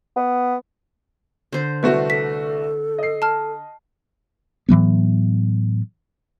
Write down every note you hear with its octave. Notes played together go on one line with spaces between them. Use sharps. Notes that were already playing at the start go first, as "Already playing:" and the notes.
B3
D3 C5
C2 A3 F#4 B4
A4 B6
D#5 C7
A5 F6
A2 E3 F#3 B3